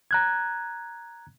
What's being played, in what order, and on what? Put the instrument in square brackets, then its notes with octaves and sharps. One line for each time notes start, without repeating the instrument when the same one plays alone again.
[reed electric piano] A#5 F#6 G#6